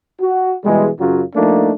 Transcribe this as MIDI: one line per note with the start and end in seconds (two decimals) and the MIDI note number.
0.21 0.55 66
0.64 0.90 47
0.64 0.90 52
0.64 0.90 55
0.64 0.90 56
1.00 1.23 42
1.00 1.23 49
1.00 1.23 54
1.00 1.23 65
1.35 1.72 53
1.35 1.72 57
1.35 1.72 58
1.35 1.72 62
1.35 1.72 63